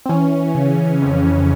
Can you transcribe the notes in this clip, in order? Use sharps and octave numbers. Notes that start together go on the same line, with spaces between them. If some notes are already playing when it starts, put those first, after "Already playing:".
C4
E3 C#4
C#3
F2